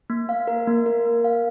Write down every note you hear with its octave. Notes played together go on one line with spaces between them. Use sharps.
A#3
F5
A#4
A#3
A#4
A#3
F5